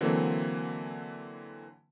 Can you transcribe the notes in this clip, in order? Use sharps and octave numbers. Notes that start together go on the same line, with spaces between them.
D3 E3 F#3 A#3 C4